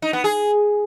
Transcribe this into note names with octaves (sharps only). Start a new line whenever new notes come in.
D#4
B3
G#4